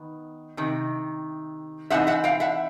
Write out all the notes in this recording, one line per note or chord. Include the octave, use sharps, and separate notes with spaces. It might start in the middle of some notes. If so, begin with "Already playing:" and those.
Already playing: D#3 B3
C3 D#3
E3 G#3 C4 D#4 E5 F#5
E5 F#5
F5 G5
E5 F#5